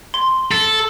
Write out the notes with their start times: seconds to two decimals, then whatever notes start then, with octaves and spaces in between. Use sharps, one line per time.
0.14 C6
0.51 A4